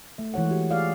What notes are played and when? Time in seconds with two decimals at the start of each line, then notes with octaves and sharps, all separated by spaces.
0.18 A3 E5
0.34 E3 G#3 C#5 F#5
0.51 F#4 G4
0.71 F4 G#4 D5 F5